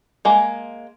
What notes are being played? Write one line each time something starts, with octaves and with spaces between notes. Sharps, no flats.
G#3 A#3